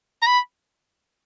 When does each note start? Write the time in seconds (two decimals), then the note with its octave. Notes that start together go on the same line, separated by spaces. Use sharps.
0.22 A#5
0.27 B5